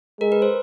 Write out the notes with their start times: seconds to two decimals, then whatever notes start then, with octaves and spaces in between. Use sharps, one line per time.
0.20 G#3 A#4
0.32 B4
0.42 C5